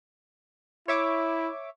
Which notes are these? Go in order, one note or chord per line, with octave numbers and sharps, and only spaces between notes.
E4 C#5 E5 D6